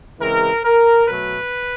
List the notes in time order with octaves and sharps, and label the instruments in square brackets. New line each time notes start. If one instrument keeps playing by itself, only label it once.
[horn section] C#3 E3 G#3 C4 A#4
A#4
B2 F#3 A3 B4